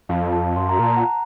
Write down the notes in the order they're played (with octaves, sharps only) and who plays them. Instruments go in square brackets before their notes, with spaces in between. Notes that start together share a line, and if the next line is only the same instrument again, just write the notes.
[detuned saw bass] F2 [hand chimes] F5 A5
[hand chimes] F5 A5
[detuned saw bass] F#2 [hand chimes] C6
[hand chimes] A#5
[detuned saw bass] A#2 [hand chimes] A5
[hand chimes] F#5 A#5